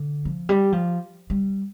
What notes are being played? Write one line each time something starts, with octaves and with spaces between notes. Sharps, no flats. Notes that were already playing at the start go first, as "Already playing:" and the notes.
Already playing: D3
F3
G3
F3
G3